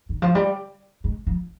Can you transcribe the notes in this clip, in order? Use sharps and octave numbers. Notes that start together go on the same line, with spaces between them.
D#3
F3
G3
G#3
F3